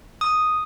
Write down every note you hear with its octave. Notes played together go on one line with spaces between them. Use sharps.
D#6